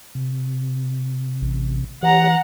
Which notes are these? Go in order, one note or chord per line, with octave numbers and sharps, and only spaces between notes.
C3
A1
E3 G4 C#5 F#5 A#5